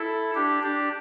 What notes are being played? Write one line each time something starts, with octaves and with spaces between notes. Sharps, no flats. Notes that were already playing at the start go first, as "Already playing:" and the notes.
Already playing: E4 A4
D4 G4
D4 G4